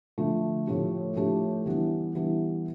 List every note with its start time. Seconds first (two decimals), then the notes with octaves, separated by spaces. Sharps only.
0.18 D3 F3 A3
0.67 A2 F3 A3 D4 G4
1.16 A2 F3 A3 D4 G4
1.66 E3 G3 B3 D4
2.15 E3 G3 B3 D4